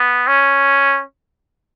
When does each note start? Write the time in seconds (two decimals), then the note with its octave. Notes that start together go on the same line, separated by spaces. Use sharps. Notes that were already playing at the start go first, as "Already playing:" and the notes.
Already playing: B3
0.27 C#4